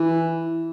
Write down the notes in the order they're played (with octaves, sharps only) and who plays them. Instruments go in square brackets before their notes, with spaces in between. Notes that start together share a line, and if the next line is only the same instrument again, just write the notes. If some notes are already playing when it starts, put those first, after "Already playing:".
Already playing: [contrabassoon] E3